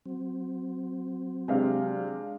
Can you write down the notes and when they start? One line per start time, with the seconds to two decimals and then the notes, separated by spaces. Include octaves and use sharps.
0.06 F#3 C4
1.48 C3 G#3 D4 F5